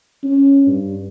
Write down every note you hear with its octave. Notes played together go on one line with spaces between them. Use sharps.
C#4
G2